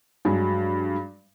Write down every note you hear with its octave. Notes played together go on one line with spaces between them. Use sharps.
G2 F#3 G#3